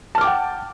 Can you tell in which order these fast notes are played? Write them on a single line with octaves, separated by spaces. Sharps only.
A5 F6 D6 G5 F#5